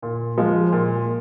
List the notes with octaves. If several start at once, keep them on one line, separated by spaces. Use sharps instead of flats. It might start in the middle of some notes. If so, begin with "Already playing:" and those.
A#2
F3 G#3
A#2